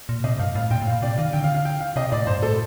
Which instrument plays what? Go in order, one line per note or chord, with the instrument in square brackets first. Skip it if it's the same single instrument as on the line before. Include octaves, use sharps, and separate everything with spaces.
[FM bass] A#2
[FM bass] C3 [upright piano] D#5
[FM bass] G2 [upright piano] F5
[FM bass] A2 [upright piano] F5
[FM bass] A#2 [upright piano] G5
[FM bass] A2
[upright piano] F5
[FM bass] A#2
[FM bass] C3 [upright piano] D5
[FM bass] D#3 [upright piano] F5
[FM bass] D3 [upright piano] G5
[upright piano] F5
F5
G5
F5
[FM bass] C3 [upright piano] D#5
[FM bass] A2 [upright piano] D5
[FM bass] G2 [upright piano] C5
[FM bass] A2 [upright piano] A4